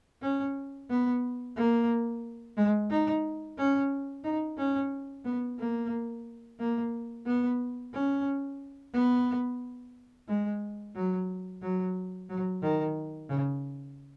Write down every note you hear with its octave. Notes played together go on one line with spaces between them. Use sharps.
C#4
B3
A#3
G#3
D#4
C#4
D#4
C#4
B3
A#3
A#3
B3
C#4
B3
G#3
F#3
F#3
F#3
D#3
C#3